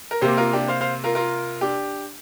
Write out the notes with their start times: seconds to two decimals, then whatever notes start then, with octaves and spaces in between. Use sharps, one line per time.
0.11 A#4
0.21 C3 A#3 G4 C5
0.37 F4 A#4
0.53 D4 G4
0.68 C5 F5
0.81 C5 F5
1.04 F4 A#4
1.15 F4 A#4
1.61 D4 G4